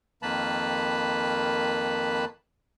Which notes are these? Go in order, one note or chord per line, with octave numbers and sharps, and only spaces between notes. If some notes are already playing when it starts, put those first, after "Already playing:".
F2 D#3 A#3 B4 A5 B5